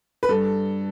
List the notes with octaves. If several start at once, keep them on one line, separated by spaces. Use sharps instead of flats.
B4
G2 A4